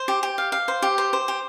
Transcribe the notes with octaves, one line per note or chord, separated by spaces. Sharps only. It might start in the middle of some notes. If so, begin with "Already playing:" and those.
Already playing: C5
G4
G4
F5
F5
C5
G4
C5
C5
G4